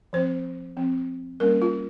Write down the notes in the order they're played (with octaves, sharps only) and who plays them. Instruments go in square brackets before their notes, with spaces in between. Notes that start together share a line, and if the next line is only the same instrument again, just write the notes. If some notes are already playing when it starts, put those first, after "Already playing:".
[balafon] F3 C4 C5
F3 C4
G3 A#3 C#4 A#4
F4